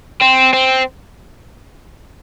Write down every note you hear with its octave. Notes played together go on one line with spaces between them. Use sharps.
C4
C4